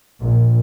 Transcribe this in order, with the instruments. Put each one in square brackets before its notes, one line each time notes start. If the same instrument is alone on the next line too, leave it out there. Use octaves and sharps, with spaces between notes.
[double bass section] A#1